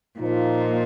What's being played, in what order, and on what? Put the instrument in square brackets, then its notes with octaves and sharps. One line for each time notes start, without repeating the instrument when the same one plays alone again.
[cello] A#2 [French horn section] F3 A#3 D#4